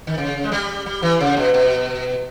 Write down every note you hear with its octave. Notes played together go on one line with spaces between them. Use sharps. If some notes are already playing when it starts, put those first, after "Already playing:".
D#3
C#3
G#3
G3
G3
E3
C#3
B2
B2